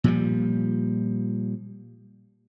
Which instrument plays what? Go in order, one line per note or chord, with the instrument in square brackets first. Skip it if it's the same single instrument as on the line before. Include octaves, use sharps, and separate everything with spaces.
[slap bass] A#2 F3 G3